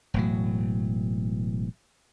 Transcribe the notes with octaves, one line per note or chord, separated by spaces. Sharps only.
E1 A2 F#3